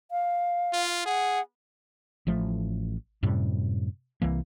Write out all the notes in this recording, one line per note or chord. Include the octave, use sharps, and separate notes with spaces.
F5
F4
G#4 F#5
A1 F3 A3
F#2 A2 C3 G3
C2 E3 A#3